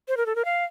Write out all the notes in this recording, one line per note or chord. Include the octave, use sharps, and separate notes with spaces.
C5
A#4
A4
A#4
F5